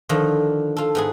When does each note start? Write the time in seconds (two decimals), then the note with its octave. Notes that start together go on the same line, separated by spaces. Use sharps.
0.09 D3 D#3 F3
0.76 F4 A4
0.95 G#2 B3 G#4